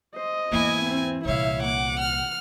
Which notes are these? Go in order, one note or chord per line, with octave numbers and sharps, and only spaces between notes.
C5 D#5
E2 G#2 E3 A#3 B3 E4 G#5
C4
C2 A#2 E4 C#5 E5 F5
A#3 F#5 D6
F6